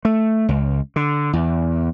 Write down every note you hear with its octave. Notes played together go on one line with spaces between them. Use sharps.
A3
C#2
D3
E2